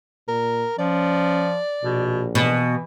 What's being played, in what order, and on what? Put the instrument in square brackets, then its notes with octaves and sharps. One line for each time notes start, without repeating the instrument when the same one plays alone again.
[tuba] A#2 [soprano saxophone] A#4
[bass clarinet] F3 [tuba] C#4 [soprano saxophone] D5
[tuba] A#1 [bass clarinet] B2
[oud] B2 [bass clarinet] E3